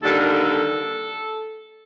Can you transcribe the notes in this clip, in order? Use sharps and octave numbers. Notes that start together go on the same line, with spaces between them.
D#2 D3 G3 A4
A#4
A4